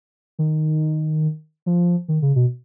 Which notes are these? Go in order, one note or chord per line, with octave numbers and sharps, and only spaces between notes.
D#3
F3
D#3
C#3
B2